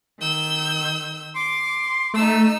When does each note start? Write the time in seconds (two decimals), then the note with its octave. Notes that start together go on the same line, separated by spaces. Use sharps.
0.21 D#3 E6 G6
1.36 C6 D6
2.14 A3 D#4 E6